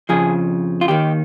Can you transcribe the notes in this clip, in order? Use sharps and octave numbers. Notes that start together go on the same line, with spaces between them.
F2 C#3 F3 G#4
F4
D#2 D#3 G4